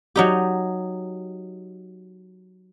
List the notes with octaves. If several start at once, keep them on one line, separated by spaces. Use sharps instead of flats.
F#3 D#4 G4